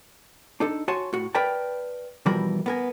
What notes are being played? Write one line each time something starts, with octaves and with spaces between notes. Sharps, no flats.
D4 D#4 A4
F#4 C#5 G#5 A5 C6
A2 F#4
A#4 B4 D5 G5 A5
B2 E3 F3 G3 A#4 B5
B3 A#4 G#5